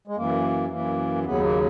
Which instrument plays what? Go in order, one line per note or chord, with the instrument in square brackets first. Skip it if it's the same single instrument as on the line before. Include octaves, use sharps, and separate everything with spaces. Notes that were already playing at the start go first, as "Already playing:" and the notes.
[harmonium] G#3
F#2 E3 A#3
F#2 E3 A#3
D#2 C#3 F#3 B3
A#3